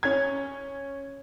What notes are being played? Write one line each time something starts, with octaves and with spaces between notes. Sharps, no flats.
C#4 G#6